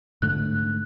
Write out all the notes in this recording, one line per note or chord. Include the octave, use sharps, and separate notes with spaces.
G#2 D3 A3 F#6